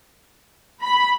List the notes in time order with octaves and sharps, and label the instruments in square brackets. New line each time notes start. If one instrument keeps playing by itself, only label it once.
[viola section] B5